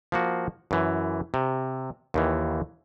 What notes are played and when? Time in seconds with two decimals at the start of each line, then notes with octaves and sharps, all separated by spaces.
0.12 F3 A#3 F#4
0.71 F#2 E3
1.34 C3
2.14 D#2 D#3 E3